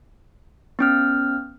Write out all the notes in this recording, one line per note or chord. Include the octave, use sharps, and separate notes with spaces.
B3 C#4 F6